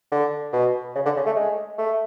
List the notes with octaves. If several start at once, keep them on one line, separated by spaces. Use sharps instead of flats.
D3
B2
C#3
D3
C#3
A3
G#3
A3